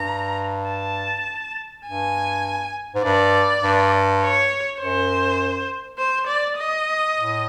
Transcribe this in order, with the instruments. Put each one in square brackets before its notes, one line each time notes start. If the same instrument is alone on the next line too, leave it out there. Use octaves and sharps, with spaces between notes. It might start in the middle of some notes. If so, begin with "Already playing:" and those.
Already playing: [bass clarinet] G2 [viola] A#5
[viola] A5
[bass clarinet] G2 [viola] G#5
[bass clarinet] G#2
[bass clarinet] G2 [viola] D5
[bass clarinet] G2
[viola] C#5
[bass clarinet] F#2 [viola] C5
[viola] C5
D5
D#5
[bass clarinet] A2